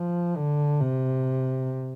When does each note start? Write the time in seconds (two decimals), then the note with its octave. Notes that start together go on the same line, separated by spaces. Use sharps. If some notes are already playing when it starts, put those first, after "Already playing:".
Already playing: F3
0.37 D3
0.80 C3